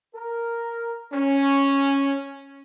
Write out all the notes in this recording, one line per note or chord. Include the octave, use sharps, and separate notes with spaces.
A#4
C#4